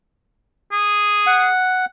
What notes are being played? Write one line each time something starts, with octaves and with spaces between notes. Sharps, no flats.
G#4
F#5